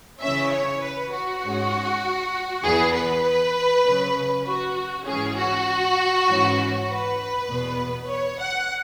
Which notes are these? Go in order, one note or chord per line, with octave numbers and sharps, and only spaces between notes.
C#3 E3 C#4 E5
C#5
B4
F#4
G#2 G#3 C#4
E2 E3 B3 G#4
B4
C#3 F#3 C#4
F#4
G#2 E3 C#4 G#4
F#4
G#2 E3 C#4
B4
E2 B2 B3
C#5
F#5